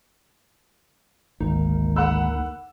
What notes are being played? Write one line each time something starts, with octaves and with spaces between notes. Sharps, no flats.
G#1 D2 A#3 D#4
F#5 B5 E6